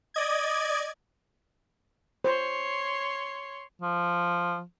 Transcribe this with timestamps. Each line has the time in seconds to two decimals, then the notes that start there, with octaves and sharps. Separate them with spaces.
0.14 D5 D#5 G#6
2.24 C5 C#5 C6
3.82 F3